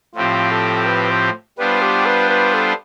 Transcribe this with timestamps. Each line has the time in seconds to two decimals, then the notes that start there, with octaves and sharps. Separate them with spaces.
0.15 A2 F3 C4 F4 G4
0.51 A4
0.86 B4
1.11 C5
1.58 G3 B3 D4 F4 B4 C5
1.82 G4
2.06 B4
2.30 B4
2.54 A4